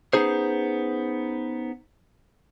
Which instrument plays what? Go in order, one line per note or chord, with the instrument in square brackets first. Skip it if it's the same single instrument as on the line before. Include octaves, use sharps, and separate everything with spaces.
[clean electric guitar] B3 C#4 D#4 G#4 C5